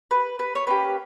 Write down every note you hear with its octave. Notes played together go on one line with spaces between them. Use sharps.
B4
B4
C#5
A#3 C#4 G4 B4